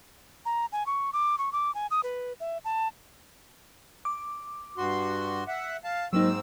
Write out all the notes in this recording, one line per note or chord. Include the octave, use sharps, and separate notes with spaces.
A#5
G#5
C#6
D6
C#6
D6
G#5
D#6
B4
E5
A5
D6
G2 F#4 C6
E5 F#5
F5 A5
G#2 F#3 A#3 C4 D#4 E6